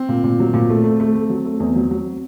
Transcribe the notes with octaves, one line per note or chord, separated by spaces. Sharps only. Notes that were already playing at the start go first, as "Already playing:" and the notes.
Already playing: C4
A#2
A#2
F#3
A#2
A3
A3
A3
A3
F#3
A3
E2
F#3
F#3